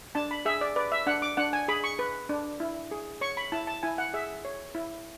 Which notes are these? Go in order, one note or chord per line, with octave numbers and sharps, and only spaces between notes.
D4 A5
B5
G#4 E5
D5
B4 D5
E5
D4 F#5
D6
D4 F#5
G#5
G#4 B5
C#6
B4
D4
E4
G#4
C#5 C#6
B5
E4 A5
A5
E4 G#5
F#5
G#4 E5
C#5
E4